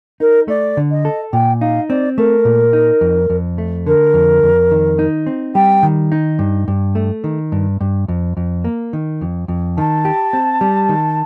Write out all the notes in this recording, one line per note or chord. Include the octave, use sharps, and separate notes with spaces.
D#4 A#4
A3 D5
D3
D#5
A4
A#2 G5
D#4 F5
C4 D5
A3 A#4
A#2
D#4
F2
F2
A3
D3 A#4
F2
F2
D#3
D#4
C4
G3 G5
D#3
D#4
G2
G2
A3
D#3
G2
G2
F2
F2
A#3
D#3
F2
F2
D#3 A5
G4
C4
G3
D#3